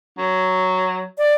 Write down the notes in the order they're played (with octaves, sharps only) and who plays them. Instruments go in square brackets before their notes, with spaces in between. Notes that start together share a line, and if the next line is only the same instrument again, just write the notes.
[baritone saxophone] F#3
[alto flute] D5